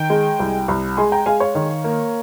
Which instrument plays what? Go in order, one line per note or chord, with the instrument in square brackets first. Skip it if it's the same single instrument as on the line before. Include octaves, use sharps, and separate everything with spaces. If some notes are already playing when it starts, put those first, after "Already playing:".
Already playing: [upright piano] D#3 G5
G#3
C2
C2
G#3 G#5 C6
G5 A#5
G#3 F5 G#5
C#5 F5
D#3
A#3